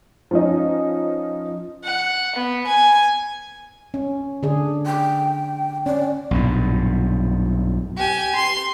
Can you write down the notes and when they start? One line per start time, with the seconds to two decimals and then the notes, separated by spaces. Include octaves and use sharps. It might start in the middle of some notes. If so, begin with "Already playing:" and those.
0.31 F3 C#4 D#4
1.84 F#5
2.36 B3
2.66 G#5
3.94 C#4
4.43 D3 D4 G#4
4.86 G5
5.86 C#4 D5
6.31 B1 G2 A#2
7.97 G4 G#5
8.36 C6